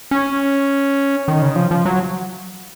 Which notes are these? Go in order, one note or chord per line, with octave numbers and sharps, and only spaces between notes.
C#4
D#3
C#3
F3
F3
F#3